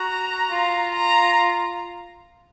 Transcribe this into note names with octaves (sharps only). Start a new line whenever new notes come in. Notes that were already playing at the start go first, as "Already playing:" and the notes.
Already playing: F#4 A#5
F4
A#5